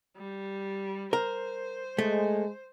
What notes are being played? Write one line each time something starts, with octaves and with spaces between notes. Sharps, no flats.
G3
A#4 C5
G#3 A3